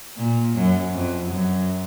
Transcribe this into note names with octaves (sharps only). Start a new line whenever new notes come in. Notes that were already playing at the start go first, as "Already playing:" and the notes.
A#2
F#2
F2
F#2